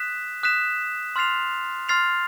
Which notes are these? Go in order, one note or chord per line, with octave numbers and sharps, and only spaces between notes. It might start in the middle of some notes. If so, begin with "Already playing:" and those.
Already playing: D#6 F#6 B6 E7
D#6 F#6 B6 E7
C6 F6 A6 C7 F7
C6 F6 A6 C7 F7